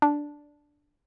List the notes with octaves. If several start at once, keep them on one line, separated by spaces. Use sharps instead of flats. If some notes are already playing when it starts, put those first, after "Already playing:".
D4